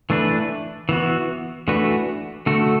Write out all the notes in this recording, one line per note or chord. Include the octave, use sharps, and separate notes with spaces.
E3 A3 D4 B4
E3 B3 F#4
E3 A3 D4 F#4 B4
D3 A3 F#4 A4